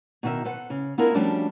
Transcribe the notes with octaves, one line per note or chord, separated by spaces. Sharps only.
B2 D#3 E5
A4 B4 C5 F#5
C#3
B3 D4 E4 F4 G#4 A#4
F3 G3 A3 C#4 D4 F#4